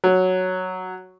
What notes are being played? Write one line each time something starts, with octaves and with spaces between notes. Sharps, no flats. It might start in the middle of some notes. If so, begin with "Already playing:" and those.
F#3